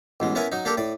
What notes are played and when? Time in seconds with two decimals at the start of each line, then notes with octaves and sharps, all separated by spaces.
0.20 A1 B2 G#3
0.35 B3 C#4 E4 A#4 G#5
0.52 F#3 D#4
0.65 A#3 D4 G4 A4 A#4
0.77 A2 D5